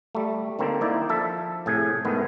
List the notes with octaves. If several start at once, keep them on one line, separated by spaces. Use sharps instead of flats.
G3 A3
D3 D#3 A#3 C4
A#3 D#4 E4 D5
F3 A4 E5
A2 C3 G#4 G#5
G#2 D#3 A3 B3